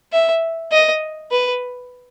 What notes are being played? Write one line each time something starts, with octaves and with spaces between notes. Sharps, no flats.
E5
D#5
B4